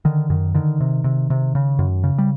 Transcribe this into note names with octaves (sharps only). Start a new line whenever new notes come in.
D3 D#3
F#2 D#3
D3 D#3
C3
C3
C3
C#3
F#2
C#3
G3